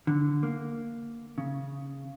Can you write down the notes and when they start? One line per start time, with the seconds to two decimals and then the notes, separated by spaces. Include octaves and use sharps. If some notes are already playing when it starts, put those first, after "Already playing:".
0.07 D3
0.43 A#3
1.38 C#3